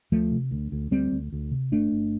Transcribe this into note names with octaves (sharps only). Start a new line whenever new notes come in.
D2 F3 A3
C3
D2
D2
D2 G3 C4
D2
D2
C3
G1 A3 D4
G1